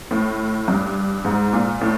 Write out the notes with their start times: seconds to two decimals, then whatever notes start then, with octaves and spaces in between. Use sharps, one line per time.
0.11 A2
0.68 G2
1.25 G#2
1.53 A#2
1.81 A2